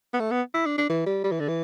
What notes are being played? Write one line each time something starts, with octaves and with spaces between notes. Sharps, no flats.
B3
A3
B3
E4
D4
D4
E3
G3
G3
E3
D3
E3